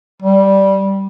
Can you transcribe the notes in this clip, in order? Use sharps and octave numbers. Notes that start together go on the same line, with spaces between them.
G3